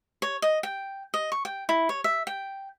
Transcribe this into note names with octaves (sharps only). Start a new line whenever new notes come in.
C#5
D#5
G5
D#5
C#6
G5
E4
C#5
E5
G5